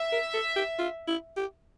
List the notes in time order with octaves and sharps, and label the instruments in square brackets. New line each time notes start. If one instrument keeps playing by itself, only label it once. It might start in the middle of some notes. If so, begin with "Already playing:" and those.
Already playing: [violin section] E5
[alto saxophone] A#4
A4
G4
F4
E4
G4